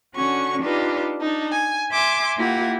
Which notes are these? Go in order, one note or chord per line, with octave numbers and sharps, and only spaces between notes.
D3 C#4 F#4 C#6
D4 D#4 F4 G4 B4
D4 D#4
G#5
E5 G#5 C6 D6
A#3 E4 F4 G4 F5 F#5